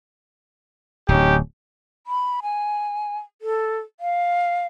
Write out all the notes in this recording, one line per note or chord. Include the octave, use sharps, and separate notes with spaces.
D1 C#4 D#4 G4
B5
G#5
A4
F5